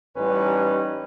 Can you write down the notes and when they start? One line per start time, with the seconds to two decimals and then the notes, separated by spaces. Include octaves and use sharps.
0.17 A1 G3 C#4 D#4 B4